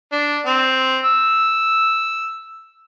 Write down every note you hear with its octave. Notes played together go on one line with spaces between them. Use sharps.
D4
C4
E6